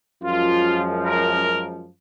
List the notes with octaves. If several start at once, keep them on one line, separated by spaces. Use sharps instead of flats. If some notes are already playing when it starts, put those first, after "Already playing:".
F#2 F3 G#3 F4
A#4